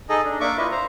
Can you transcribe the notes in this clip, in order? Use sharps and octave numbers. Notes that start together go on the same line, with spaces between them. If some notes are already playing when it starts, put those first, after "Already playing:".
D#4 G#4 A4 D#5
D4
A#3 D4 E5 C#6 D6
E4 F4 B4 D#5 E5
C5 A#5